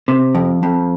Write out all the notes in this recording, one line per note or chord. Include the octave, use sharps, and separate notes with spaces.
C3
F2
F2